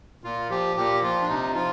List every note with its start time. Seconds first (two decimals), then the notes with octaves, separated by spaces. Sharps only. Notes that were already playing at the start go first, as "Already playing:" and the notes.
0.24 A#2 F4
0.50 F3 G4
0.76 A#2 G4
1.02 F3 F4
1.22 D4
1.28 C3 D#4
1.55 F3 F4